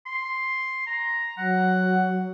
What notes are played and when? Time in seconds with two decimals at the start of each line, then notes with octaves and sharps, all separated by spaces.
0.06 C6
0.87 A#5
1.37 F#3 F#5